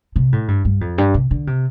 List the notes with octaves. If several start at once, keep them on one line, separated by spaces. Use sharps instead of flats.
C3
A2
G2
G2
F2
G2
C3
D3
C3